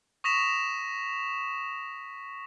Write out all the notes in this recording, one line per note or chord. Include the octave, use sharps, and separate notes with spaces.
C#6 D#6 A#6 B6 E7 F7